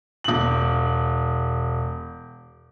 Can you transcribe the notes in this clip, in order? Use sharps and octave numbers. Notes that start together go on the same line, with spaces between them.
E1 F#7